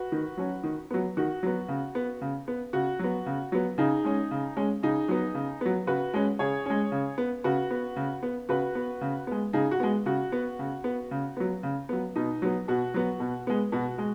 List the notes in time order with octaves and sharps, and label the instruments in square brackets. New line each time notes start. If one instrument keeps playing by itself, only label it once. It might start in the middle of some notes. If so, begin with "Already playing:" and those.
Already playing: [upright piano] F#4 B4
D#3
F#3 C#4
D#3
F#3 B3
D#3 F#4
F#3 B3
C#3
B3
C#3
B3
C#3 F#4
F#3 B3
C#3
F#3 B3
C#3 D#4 G#4
G#3 C#4
C#3
G#3 C#4
C#3 D#4 G#4
F#3 B3
C#3
F#3 B3
C#3 F#4 B4
G#3 C#4
C#3 G#4 C#5
G#3 C#4
C#3
B3
C#3 F#4 B4
B3
C#3
B3
C#3 F#4 B4
B3
C#3
G#3 B3
C#3 D#4 G#4
F#4
G#3 B3
C#3 F#4
B3
C#3
B3
C#3
F#3 B3
C#3
F#3 B3
B2 D#4
F#3 B3
B2 F#4
F#3 B3
B2
G#3 B3
B2 F#4
G#3